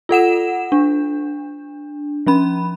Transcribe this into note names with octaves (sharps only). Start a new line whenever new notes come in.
F4 A4 F#5 E7
D4
F3 C#4 B5